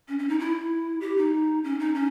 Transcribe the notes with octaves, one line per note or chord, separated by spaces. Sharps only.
C#4
C#4
D#4
E4
G4
D#4
C#4
D#4
C#4